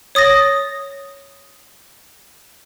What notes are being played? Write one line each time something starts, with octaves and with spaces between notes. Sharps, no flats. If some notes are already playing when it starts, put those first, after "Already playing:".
C#5 D#6 A6 A#6